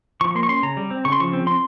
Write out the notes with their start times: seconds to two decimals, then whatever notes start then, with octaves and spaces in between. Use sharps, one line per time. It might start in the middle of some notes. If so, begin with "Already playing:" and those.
0.21 F3 C#6
0.31 C#6
0.35 A#3 C6
0.43 C#6
0.49 C#4 C6
0.63 C#3 A#5
0.77 G3
0.91 C4
1.05 C#3 C#6
1.12 C6
1.20 F3 C#6
1.33 C4
1.47 C4 C6